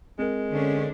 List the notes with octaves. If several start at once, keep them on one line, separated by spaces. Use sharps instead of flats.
G#3 C4 A#4
D3 C#4 D4 C5